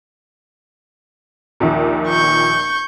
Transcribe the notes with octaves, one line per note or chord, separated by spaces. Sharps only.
A#1 D#2 A#2
C#6 G6